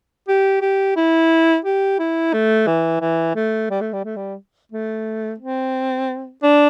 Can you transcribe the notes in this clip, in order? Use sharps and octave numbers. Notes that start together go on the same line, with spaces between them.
G4
G4
E4
G4
E4
A3
E3
E3
A3
G3
A3
G3
A3
G3
A3
C4
D4